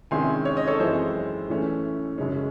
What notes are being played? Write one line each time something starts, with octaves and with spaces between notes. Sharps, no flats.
C3 D#3 G#3 C#4 E4 G#5 C6
C#5
D#5
A4 C#5
F#2 E3 G#3 C4 E4 C5
A2 E3 A3 C#4
F#2 C#3 G#3 C#4